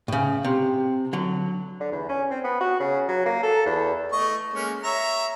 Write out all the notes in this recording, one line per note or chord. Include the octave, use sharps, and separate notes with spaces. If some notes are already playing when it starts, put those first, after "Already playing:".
A2 C#3
C3
D3 F#3
D3
E2
C#4
C4
B3
F#4
C#3
F#3
A#3
A4
E2
A3 D#5 C#6
G#3 A#3 C#4
C#5 E5 A#5